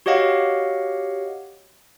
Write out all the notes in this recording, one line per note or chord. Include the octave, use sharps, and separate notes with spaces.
F#4 G4 C#5 D#5 F5 F#5